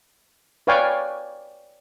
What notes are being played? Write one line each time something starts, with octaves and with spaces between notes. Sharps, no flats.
B4 C#5 D5 F5 G5 G#5